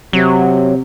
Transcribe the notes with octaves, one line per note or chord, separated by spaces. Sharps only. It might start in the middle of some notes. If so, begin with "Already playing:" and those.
C3 F#3